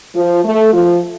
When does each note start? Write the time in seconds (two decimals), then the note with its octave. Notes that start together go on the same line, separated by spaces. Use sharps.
0.15 F3
0.45 A3
0.74 F3